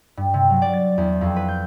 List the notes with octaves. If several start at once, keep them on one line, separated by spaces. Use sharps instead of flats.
G2
C3
F#3
D5
A6
E2
F2
B4
G6